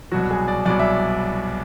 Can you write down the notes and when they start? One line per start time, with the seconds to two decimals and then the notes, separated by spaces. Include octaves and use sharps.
0.12 C2 B2 F#3 F#4
0.31 G#4
0.48 D5
0.66 C2 B2 F#3 D5
0.79 E5